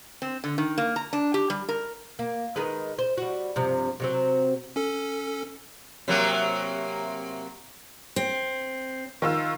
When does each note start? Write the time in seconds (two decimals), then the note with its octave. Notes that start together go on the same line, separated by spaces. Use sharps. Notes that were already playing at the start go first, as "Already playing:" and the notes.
0.22 C4
0.44 D3
0.58 D#3
0.78 A#3
0.96 A#5
1.13 D4
1.34 G4
1.50 G3
1.69 A#4
2.19 A#3
2.56 D#3 G#3 B4
2.98 C5
3.17 G3 F#4
3.56 G2 C3 F3
4.00 C3 F#3 C4
4.76 C#4 A4
6.08 C3 F#3 A#3
8.16 C4
9.22 D#3 F4 E6